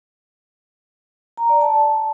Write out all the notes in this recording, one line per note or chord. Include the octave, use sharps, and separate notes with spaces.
A#5
D5
A5